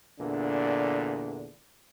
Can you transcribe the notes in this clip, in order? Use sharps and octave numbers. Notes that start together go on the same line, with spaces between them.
E2 A#2 D3 D4